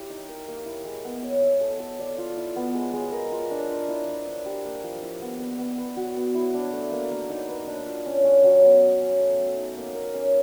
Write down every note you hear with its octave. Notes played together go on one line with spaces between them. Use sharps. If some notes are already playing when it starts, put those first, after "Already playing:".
Already playing: E4 G4
D#4
A#4
A#3
E4
G#3
B3
C#5
E5
A4
A4
D5
F4
E4
B3
G#3
G#3
A#4
F4
D4
F4
E4
C5
D4
G4
A#3
F3
E4
B3
B3
B3
B4
F#4
B3
E4
D4
A3
A#3
A#3
D#4
B4
D4
F4
C#4
C#4
F#3
B3
D#5
C#4
A3
A3
D#4
A#3
A#4
C#4